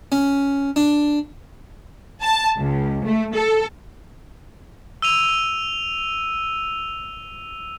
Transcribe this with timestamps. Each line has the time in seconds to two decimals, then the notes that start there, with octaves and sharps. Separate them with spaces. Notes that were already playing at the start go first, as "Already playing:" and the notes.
0.12 C#4
0.76 D4
2.23 A5
2.58 C#2
3.05 A3
3.35 A4
5.02 E6 D#7 F7